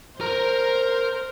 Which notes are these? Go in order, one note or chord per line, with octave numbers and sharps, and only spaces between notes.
A#4 C5 A#5